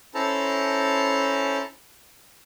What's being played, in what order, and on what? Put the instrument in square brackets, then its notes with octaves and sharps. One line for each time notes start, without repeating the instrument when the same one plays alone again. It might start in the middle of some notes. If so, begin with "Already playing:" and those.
[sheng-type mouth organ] C#4 E4 A4 C5 A5 A#5